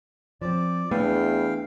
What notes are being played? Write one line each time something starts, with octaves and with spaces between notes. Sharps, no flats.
F3 C4 D5
E2 A3 B3 D4 B4 F5 G5